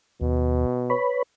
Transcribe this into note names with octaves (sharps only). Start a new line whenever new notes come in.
D#2 B2
B4 C#5 B5